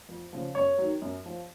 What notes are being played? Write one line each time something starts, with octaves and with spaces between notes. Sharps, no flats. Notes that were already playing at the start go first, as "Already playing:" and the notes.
F2
C#3 F3
F#2 C#5
D#3 F#3
F#2
F3